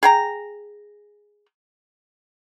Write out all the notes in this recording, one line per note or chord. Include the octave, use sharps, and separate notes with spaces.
G#4 G5 A#5